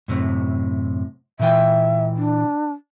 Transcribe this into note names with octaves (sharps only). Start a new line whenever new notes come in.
F#2 A2 C3
A#2 E3 E5 G5
D4